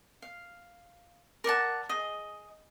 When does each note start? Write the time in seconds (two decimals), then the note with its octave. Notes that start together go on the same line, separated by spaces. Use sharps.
0.22 F5
1.44 A#4 D5 F#5 A5
1.89 G#4 D#5